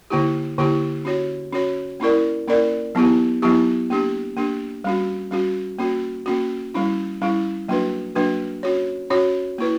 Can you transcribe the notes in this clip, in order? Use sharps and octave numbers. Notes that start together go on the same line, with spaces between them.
D3 A#3 E4 G4
D3 A#3 E4 G4
C#4 F#4 C#5
C#4 F#4 C#5
A#3 C#4 E4 A#4 D5
A#3 C#4 E4 A#4 D5
F#3 B3 E4 G4
F#3 B3 E4 G4
A#3 D4 G4
A#3 D4 G4
G3 C#4 F#4
G3 C#4 F#4
A#3 C#4 F#4
A#3 C#4 F#4
G3 C#4 E4
G3 C#4 E4
F#3 A#3 D4 F#4 B4
F#3 A#3 D4 F#4 B4
C#4 F#4 C#5
C#4 F#4 C#5
A#3 E4 B4